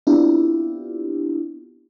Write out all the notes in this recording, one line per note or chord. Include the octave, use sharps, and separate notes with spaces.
B3 C4 D4 E4 F4 G4